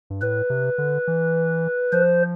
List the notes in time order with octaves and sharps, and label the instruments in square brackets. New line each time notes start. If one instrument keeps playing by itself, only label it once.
[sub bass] G2
[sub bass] A2 [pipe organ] B4
[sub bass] C3
D3
E3
[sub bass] F3 [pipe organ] C5